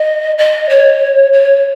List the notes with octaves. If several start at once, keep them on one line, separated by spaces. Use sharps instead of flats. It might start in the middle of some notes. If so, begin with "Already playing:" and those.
Already playing: D#5
D#5
C#5
C#5